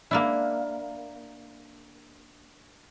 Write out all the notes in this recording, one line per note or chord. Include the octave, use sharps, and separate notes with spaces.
A#3 D4 E4